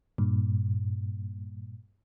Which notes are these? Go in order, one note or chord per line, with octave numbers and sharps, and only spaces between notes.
G2 A#2